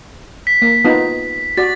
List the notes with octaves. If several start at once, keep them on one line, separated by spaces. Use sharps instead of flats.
B6
A#3
B3 D#4 F4
F#4 D5 A6